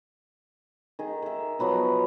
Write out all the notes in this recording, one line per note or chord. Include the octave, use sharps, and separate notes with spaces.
D#3 G#4
A#4 E5
F3 F#3 B3 D#4